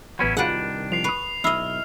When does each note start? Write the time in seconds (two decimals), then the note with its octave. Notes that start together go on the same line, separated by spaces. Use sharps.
0.19 A1 F#3 B3 C#4 E4 B5
0.37 C2 D#3 D4 F4 F#4 G#4 B4 F#5
0.92 F3 C7 F7
1.04 B4 C#6 D#6 C7
1.44 B1 E4 D#5 F6 C7